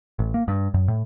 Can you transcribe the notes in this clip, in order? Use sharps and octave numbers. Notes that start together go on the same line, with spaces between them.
A1
A#3
G2
F#2
A2